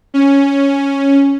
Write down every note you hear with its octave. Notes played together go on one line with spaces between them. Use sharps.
C#4